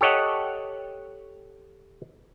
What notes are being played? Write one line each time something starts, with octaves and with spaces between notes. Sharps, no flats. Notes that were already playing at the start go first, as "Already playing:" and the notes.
G4 A4 C#5 D#5 F#5